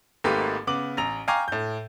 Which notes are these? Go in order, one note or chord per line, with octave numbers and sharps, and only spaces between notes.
G#1 G#2 A3 A#3 G4 B4
C#3 B3 D6 F#7
A1 A#5 F7
F5 G5 G#5 A#5 C#6 D6
A2 G6